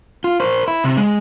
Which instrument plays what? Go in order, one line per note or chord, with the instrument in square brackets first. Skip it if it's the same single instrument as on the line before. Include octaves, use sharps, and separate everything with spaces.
[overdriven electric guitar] F4
A#4 C5
E4
C3
G#3